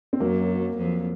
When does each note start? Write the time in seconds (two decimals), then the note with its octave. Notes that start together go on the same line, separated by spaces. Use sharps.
0.13 C4
0.20 F#2 F#3 A#3
0.78 F2